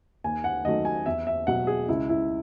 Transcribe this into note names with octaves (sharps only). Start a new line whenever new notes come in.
D#2 G#5
F#5
D#3 F#3 A3 D#5
G#5
E2 E5
E5
B2 F#3 F#5
G#4
C#2 E4
E4